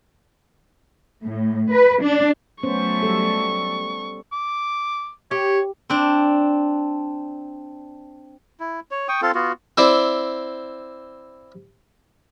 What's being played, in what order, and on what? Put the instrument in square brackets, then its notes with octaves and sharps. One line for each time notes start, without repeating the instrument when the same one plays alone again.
[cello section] A2
B4
D4
[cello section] F#3 A3 [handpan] B3 C#4 C5 [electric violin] C#6
[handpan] G3 A4
[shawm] D6
[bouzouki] G4 [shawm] C#5
[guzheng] C4 D4
[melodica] E4
C#5
G5 C#6 D#6
C4 F4 A4
B3 F4 F#4
[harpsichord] C4 E4 C5 D5